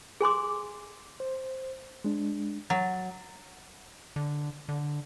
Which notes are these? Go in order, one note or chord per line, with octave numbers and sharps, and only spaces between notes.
G#4 G#5 C6 D6
C5
G#3 D4
F#3 A6
D3
D3